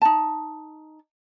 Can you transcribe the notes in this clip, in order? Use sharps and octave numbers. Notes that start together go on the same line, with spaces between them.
D#4 A5